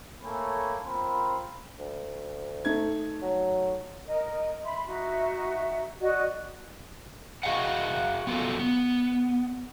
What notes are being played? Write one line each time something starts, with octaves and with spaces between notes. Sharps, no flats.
A3 A#3 A4 C#5 G#5 B5
C4 F4 A#4 C5 B5
D2
A3 D#4 G#6
F#3
A#4 D#5
E5 B5 C6
D#4 F#4 E5
F#4 D5 D#5
F#4 G#4 D#5 F5 F#5
B3 F4 F#4 A4
B3